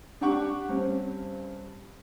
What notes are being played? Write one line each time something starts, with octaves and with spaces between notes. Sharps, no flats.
D4 G4 F#5 C#6 D6
G2 C4 C#4